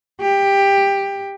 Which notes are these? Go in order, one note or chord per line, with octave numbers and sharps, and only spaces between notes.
G4